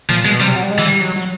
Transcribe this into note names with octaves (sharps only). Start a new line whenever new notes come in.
A#2 F3
B2 G#3
C3 G3
F#3
G3
G#3
E3
G3
F#3
F#3